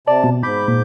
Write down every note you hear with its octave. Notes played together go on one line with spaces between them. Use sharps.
C3 D5 A5
B2
G#2 B5 D6 G6
A#2